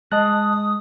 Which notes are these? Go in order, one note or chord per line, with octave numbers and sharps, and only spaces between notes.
G#3 D#5 A5 D#6 F#6